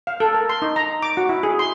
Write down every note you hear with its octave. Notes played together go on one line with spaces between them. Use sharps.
F5
A4
A#4
C6
D#4
A#5
D6
F#4
E4
G#4
C6